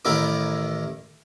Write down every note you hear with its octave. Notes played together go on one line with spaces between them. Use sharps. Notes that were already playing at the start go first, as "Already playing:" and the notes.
A1 D#3 E4 A#4 D6